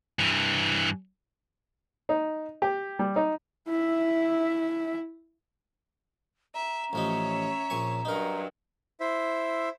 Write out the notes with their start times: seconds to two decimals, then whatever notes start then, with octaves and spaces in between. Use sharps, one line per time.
0.19 G2 E3
2.09 D#4
2.62 G4
2.99 G3
3.16 D#4
3.68 E4 E5
6.55 E5 A#5
6.93 A1 F3 C#4 D#4 C#5 E5
7.70 A#1 G#5 C#6
8.05 G2 F#3 D#4 A#4
9.00 E4 C5 E5